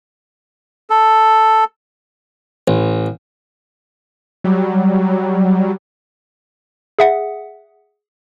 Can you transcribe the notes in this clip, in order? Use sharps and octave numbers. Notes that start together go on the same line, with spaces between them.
A4
A1
F#3 G3
G#4 E5 F#5